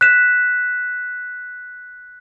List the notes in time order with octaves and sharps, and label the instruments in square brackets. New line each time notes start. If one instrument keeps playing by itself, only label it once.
[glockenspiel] F#6 B6 E7